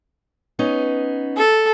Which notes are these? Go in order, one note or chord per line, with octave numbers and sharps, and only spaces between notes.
B3 C#4 D#4
A4